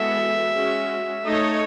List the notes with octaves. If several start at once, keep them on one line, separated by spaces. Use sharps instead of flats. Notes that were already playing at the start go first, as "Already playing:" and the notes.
Already playing: E3 G#3 B3 F#4 A4 E5
G#3 C#4 F#4
A3 D#4 A4 C#5 D#5